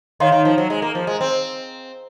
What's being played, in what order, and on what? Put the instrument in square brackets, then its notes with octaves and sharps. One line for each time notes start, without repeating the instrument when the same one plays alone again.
[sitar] D#3 [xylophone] C#5 F5 C6
[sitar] D#3
F3
F#3
G#3
A#3
F3
G#3
C4